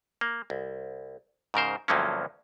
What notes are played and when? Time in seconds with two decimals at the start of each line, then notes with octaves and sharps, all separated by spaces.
0.21 A#3
0.50 C2
1.54 G#2 C#3 A#4 C5
1.88 D2 G2 F3 F#3 A#3 C#4